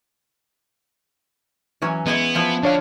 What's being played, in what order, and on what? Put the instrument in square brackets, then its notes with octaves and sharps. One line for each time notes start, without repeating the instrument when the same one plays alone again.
[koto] E3 F#3 C#4
[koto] G#3 E4 G#4 [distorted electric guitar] B3
[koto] F3 E4 F4
[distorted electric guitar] D3 [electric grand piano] D4 C#5 F5